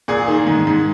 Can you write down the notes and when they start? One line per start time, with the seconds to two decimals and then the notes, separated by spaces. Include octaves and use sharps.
0.08 A#2 G#4
0.28 D#3
0.47 G#2
0.67 G#2